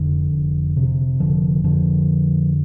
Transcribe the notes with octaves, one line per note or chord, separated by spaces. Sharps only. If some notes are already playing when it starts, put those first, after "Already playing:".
Already playing: F1 F2 D3
F1
C3
F1 D3 F3
F2 D3 F3